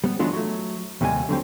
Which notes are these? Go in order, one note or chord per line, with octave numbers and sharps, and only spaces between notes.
G3 B3
E3 F#3 G#3 B3 D4 F4
F#3 A3
D#2 C3 G3 B4 G#5
D3 F#3 G3 C4